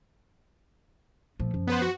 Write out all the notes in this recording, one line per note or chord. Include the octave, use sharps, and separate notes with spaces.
A#2 F3 A3
F#2
B3 B4 C5
F#4